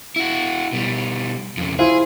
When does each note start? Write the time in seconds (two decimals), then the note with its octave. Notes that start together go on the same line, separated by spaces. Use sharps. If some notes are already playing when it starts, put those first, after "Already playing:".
0.16 E4 F#4
0.73 B2 G3
1.57 F2 C#3
1.79 E4 F4 G#4 C5